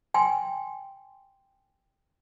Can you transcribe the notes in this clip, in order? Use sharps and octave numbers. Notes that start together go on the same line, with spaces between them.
G5 G#5 C6